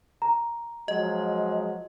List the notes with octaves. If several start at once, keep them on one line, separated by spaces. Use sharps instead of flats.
A#5
F3 F#3 G#3 D#5